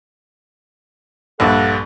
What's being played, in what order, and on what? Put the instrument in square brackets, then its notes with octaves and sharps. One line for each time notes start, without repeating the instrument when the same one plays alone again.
[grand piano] A#1 G2 [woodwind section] A4 D5 F#5